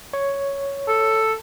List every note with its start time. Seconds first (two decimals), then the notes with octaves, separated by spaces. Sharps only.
0.13 C#5
0.89 A4